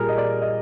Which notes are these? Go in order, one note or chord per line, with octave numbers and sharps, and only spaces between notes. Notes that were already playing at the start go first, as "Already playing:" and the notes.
Already playing: A#2 G3 A#3 G#4 A#4
D#5
D5
D#5